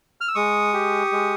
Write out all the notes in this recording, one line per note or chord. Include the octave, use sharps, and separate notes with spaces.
F6
E6
G#3 C#6 D#6
G4
G#3